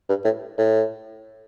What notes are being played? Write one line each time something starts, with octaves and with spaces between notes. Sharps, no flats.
G2
A2
A2